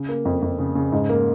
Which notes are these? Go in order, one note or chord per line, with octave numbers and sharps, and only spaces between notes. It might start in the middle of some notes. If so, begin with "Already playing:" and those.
Already playing: C#3
A#3
F2
F2
C#3
C#3
G#2
A#3